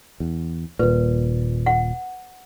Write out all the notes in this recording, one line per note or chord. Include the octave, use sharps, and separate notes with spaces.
E2
D#1 A#2 B4
F#5